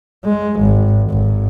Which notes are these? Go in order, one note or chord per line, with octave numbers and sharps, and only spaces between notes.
G#3
G#1
G#1